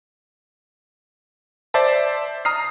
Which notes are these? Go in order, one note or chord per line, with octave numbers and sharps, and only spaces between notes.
C5 D5 E5 A5
A#5 D#6 F6 C7